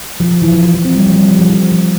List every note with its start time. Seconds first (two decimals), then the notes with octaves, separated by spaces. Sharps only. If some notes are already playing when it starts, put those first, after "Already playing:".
0.20 F3
0.31 F3
0.42 E3
0.52 F3
0.63 F3
0.74 F3
0.85 C4
0.96 G3
1.06 F3
1.13 A3
1.17 G3
1.28 F3
1.39 F3
1.50 F3
1.71 F3